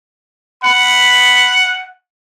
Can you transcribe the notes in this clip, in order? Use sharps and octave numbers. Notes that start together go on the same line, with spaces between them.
F#5 B5